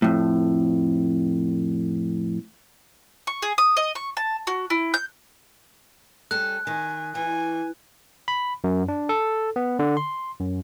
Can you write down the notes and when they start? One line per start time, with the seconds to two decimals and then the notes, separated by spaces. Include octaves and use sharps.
0.02 F2 A2
3.27 C#6
3.42 G#4
3.58 D#6
3.77 D#5
3.95 C#6
4.17 A5
4.47 F#4
4.70 E4
4.94 G6
6.31 G3 C#4 A4 F#6
6.67 D#3 G#5
7.15 E3 G#5
8.28 B5
8.64 F#2
8.88 D4
9.09 A4
9.56 B3
9.79 D3
9.97 C6
10.40 F#2